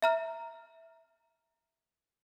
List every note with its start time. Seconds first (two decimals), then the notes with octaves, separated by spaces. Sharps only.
0.02 E5 A#5 F6